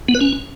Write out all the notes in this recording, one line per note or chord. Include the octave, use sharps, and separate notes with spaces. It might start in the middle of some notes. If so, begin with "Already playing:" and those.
B3
B4
C#4